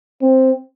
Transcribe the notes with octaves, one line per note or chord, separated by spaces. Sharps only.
C4